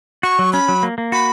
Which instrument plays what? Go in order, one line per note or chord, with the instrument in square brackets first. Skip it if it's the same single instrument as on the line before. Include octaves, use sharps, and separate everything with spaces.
[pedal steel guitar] F#4 [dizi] C#6
[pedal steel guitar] F#3
[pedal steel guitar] C#4 [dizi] B5
[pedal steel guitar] F#3
A#3
A#3
[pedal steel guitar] F#4 [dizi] B5